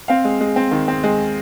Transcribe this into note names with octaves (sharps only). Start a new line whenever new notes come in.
C4 F5
G#3
G#3
C4
D#3
C4
G#3